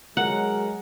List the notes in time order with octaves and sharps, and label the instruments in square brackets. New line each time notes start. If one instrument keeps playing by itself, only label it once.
[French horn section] F#3 G#3 [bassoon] A#4 [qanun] F#5